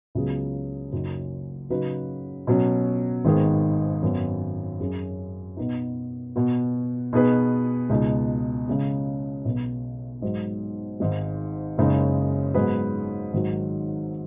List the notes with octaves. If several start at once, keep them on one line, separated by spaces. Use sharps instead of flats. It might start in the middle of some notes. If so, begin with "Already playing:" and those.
C#2 C#3 F#3 B3 G#4
F#1 F#2 F#3 D#4
C#3 F#3 D#4 F#4 B4
B2 F#3 C#4
G#1 G#2 D#3 B3 G#4
G#1 F#2 F#3 B3
F#2 F#3 C#4 G#4
B2 B3 D#4
B2 B3 F#4
B2 B3 D#4 G#4 B4
C#2 B2 G#3 D#4
C#3 G#3 C#4
B1 B2 B3
G#2 F#3 D#4
G#1 G#2 G#3
F#1 F#2 C#3 G#3 D#4
G#2 F#3 B3 G#4 B4
G#1 G#2 D#3 F#3